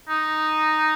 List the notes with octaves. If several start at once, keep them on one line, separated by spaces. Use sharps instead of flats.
D#4